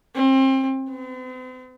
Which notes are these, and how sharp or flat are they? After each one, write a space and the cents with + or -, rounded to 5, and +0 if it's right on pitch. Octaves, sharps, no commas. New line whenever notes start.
C4 +30
C4 -45